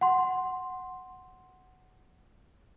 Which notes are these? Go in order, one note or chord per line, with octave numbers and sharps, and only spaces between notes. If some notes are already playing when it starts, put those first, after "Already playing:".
F#5 C6